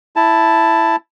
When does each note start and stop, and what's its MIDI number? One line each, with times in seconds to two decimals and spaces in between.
0.16 0.96 64
0.16 0.96 81